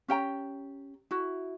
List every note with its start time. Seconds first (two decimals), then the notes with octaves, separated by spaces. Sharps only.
0.08 C#4 G4 G5 A#5
1.11 E4 F#4